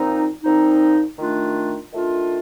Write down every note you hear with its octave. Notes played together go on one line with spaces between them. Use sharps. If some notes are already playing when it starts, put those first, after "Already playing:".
Already playing: A#2 F3 C4 D#4
A#2 F3 C4 D#4
D#3 A3 D4 F4
D#3 A3 D4 F4